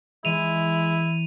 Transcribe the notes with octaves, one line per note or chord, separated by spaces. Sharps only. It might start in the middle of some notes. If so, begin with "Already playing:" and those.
E3 G#3 E4 D#7 F7